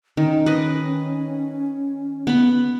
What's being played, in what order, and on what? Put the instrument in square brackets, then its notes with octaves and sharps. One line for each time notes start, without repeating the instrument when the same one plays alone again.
[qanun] D#3 [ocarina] C#4
[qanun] B4 D#5
B3 B5